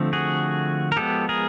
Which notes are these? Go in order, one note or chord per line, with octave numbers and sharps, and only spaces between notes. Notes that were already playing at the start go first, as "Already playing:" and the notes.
Already playing: D3 F3 A3 C4
F#4 G#4
A#4
F3 G#3 B3 G4 A4
G#4 A#4